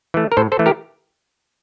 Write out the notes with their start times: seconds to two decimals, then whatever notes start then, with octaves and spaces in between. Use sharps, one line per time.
0.14 E3 A3
0.32 A#4
0.37 A2 A4 C5
0.52 A4 C5
0.59 E3 A3
0.66 G4 A#4